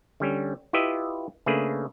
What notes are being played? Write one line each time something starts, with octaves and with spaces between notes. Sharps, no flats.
D3 G3 C#4
E4 F4 G4 B4 D#5 E5
C#3 A3 A#3 D4 G#4 B4